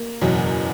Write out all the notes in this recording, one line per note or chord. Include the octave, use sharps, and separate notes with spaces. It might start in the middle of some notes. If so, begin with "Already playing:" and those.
Already playing: A#3
F#1 E2 B2 F#3